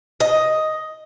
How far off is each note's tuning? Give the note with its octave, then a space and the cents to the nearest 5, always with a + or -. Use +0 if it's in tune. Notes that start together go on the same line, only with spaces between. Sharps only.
D#5 +5